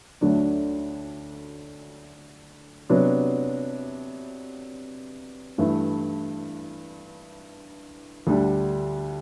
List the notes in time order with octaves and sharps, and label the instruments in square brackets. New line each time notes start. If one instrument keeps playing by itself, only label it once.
[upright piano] D2 D3 F#3 A3 D4
C3 F#3 B3 D4
G2 E3 A3 E4
D2 D3 G3 D4